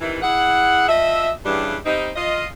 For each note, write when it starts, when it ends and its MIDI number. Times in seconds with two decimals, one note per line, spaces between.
0.01 0.19 48
0.01 0.19 51
0.01 0.19 52
0.22 0.87 64
0.22 0.87 68
0.22 0.87 78
0.89 1.30 53
0.89 1.30 75
0.89 1.30 76
1.45 1.77 43
1.45 1.77 49
1.45 1.77 52
1.45 1.77 55
1.45 1.77 62
1.86 2.10 55
1.86 2.10 60
1.86 2.10 63
2.16 2.47 65
2.16 2.47 75